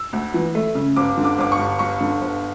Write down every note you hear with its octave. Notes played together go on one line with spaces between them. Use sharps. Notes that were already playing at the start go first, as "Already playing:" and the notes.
Already playing: E6
D2
E3
A3
C#3
G1 D6
D3
D6
G1 D6
C#6
G2
G1 C#6
D3
G1